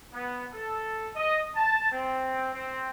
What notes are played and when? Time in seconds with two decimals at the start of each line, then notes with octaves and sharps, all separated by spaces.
0.14 B3
0.53 A4
1.16 D#5
1.56 A5
1.92 C4
2.53 C4